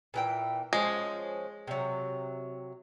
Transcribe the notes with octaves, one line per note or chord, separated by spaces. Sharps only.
A#2 E3 G5
F3 G#3 C#4
C3 F#3